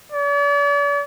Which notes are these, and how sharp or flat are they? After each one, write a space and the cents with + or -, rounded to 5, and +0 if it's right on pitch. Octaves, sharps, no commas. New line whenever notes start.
D5 -45